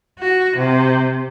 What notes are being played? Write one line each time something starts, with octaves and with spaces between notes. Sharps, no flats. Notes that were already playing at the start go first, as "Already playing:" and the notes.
F#4
C3